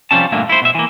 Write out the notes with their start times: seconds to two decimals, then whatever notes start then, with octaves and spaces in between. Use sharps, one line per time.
0.11 C3 F3 G3 C#4 A5
0.32 G2 A#2 D3 A3 A#3
0.50 E4 C5
0.62 B2 E5
0.75 E3 A#3